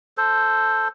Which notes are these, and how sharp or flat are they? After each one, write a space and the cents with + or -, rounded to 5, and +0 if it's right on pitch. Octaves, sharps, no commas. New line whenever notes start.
A4 +0 C5 +0